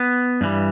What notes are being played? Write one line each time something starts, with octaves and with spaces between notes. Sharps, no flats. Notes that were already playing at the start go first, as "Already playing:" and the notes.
Already playing: B3
G2 E3 G3